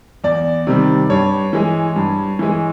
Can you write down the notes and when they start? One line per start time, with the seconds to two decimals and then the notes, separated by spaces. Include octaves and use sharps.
0.24 E2 D5
0.67 C3 D#3 G3
1.10 G2 C#5
1.53 E3 G#3
1.96 G2
2.39 E3 G#3